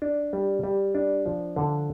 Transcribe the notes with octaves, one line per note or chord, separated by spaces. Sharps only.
D4
G3
G3
D4
F3
D3